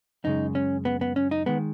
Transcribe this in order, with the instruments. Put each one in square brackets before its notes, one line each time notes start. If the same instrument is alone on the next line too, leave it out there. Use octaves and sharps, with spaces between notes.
[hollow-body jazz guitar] F#2 C#3 G#3 D#4
C#4
B3
B3
C#4
D#4
D#3 G#3 B3